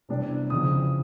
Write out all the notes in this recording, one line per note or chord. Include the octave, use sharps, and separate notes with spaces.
C3 E3 G3 B3 D4
F2 C#3 E3 D#6